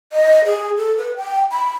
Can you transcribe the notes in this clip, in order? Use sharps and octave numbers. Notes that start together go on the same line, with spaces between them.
D#5
G#4
A4
B4
G5
B5